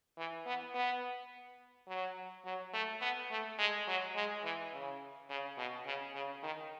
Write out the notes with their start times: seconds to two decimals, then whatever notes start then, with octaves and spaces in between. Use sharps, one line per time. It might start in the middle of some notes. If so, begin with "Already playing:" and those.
0.18 E3
0.46 B3
0.74 B3
1.88 F#3
2.45 F#3
2.73 A3
3.01 B3
3.30 A3
3.59 G#3
3.87 F#3
4.16 G#3
4.44 E3
4.73 C#3
5.29 C#3
5.58 B2
5.86 C#3
6.14 C#3
6.43 D#3